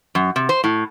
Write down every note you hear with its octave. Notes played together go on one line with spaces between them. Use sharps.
F#2
C3
C5
A2